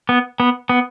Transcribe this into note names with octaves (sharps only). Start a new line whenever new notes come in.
B3
B3
B3